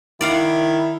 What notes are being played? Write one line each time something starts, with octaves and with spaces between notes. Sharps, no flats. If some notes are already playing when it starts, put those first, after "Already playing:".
D#3 E4 D5 F5 F#5